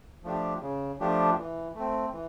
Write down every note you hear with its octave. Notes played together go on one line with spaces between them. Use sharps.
F3 A3 D4 G4
C#3
F3 A3 D4 G4
E3
A3 C4
E3